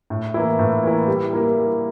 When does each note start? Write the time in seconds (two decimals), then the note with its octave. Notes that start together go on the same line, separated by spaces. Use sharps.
0.10 A2
0.34 E3 A#3 E4
0.59 A2
0.83 E3 A#3 E4
1.07 G3
1.32 A#3 E4 A#4
1.57 G3